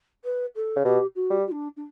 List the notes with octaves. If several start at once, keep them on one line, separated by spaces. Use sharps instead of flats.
B4
A4
C#3
B2 G4
F#4
G3
F#4
D4
D4